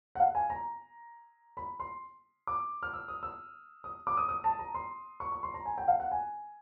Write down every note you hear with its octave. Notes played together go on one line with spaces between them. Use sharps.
F#5
F5
G#5
A#5
B5
C6
D6
F6
E6
D#6
E6
D#6
D6
D#6
D#6
A5
A#5
C6
C#6
C#6
C6
A#5
G#5
G5
F5
F#5
G#5